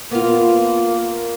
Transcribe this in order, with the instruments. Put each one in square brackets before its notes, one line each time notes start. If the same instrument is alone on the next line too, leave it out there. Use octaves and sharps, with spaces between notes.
[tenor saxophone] A#3 [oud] B3 F4